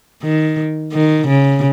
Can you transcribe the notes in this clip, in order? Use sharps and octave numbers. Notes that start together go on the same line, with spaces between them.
D#3
D#3
C#3